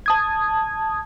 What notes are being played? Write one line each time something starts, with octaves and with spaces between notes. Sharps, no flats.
A5 D#6 G#6